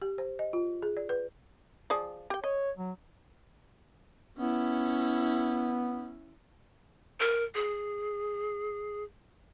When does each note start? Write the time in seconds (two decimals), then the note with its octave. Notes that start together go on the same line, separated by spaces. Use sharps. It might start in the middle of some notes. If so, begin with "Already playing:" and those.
0.02 G4
0.18 C5
0.39 D#5
0.53 F4
0.82 G#4
0.97 D5
1.09 B4
1.90 F3 G#4 D5
2.30 G4 G5
2.44 C#5 D#5
2.77 F#3
4.38 B3 C#4 E4
7.20 A#4
7.55 G#4